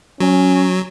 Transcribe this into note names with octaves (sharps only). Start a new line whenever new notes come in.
F#3 C#4